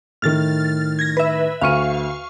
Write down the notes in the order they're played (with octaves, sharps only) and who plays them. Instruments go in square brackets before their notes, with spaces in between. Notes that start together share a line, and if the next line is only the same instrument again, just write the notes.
[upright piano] A2 D#3 [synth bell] F6 A6
[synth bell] G#6 A#6
B4 E5
[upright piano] D2 F6 D#7 [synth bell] F5 C#6